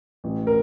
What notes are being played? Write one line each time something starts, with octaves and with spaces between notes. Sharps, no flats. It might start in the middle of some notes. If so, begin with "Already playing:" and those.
A1
A#4